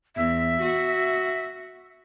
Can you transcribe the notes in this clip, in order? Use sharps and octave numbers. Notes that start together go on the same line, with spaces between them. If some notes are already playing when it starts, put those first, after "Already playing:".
E2 E5
F#4